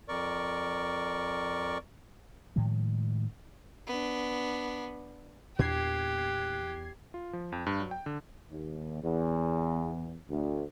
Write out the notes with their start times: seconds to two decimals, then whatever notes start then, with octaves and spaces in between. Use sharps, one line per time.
0.08 F2 A#4 D5 C#6
2.56 A2 D#3 F3 G#3
3.87 B3 D4
5.59 E2 A#2 D4 G4 F#6 G#6 C7
7.14 F4
7.33 F3
7.52 F2
7.66 G2
7.80 F#3
7.91 G5
8.06 D3
8.49 D#2
9.02 E2
10.29 D2